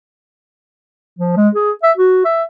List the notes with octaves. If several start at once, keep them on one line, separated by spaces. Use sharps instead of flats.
F3
G#3
G#4
E5
F#4
E5